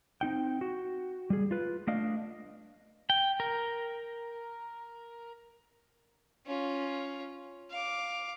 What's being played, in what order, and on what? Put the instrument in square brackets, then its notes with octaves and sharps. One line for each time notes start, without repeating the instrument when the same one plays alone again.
[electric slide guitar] C4 D#4 G5
F#4
G3 G#4
F4 B4
A3 D4 D#5 F5
[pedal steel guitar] G5
A#4
[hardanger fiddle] C#4 F4
F5 D6